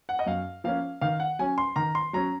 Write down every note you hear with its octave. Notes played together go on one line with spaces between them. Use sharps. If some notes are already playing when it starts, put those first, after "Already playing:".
F#5
D#5
F#2 F5
F3 A#3 C#4 F5
D#3 F5
F#5
F#3 C#4 G#5
C6
D#3 A#5
C6
F#3 C#4 A#5